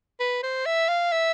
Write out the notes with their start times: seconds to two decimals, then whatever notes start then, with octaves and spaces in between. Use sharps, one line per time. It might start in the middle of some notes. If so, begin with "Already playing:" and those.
0.20 B4
0.43 C5
0.66 E5
0.88 F5
1.12 E5